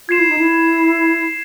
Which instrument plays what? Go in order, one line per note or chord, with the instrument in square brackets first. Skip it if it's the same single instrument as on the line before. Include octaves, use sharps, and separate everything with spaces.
[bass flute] F4 [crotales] G#6 C7 E7
[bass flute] E4
D#4
E4